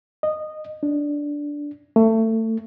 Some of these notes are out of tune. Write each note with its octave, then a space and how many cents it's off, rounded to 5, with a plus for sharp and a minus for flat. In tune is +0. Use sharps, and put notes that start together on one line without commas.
D#5 -15
D4 -10
A3 +25